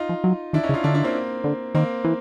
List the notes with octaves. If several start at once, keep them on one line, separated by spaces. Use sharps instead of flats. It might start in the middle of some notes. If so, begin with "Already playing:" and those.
Already playing: D#4 F4
F3
F#3
D#3 D4 E4
C#4 D#4
C#3
D#4 F4
D3 D4 E4
D4 E4
A#3 C4
D3
D#3 A#3 C4
E3